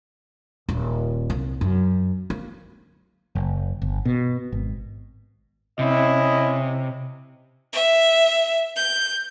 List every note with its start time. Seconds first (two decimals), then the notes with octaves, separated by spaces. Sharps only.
0.69 D#1
1.30 C2
1.61 F#2
2.30 A#3
3.35 F#1
3.82 G1
4.05 B2
4.52 G#1
5.79 C3 C#4 E4 D#5
7.73 E5
8.76 G6